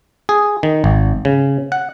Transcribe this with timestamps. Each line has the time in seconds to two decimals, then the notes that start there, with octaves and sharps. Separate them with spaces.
0.29 G#4
0.63 D#3
0.84 G#1
1.25 C#3
1.72 F#5